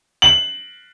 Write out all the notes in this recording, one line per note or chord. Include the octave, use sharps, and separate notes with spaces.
F#7